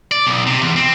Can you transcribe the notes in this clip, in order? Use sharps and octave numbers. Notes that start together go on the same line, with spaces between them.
D5
B1
C3
E2
C4